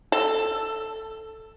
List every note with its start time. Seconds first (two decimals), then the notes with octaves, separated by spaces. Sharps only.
0.12 A4